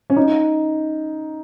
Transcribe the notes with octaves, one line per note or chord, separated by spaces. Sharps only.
C#4
D#4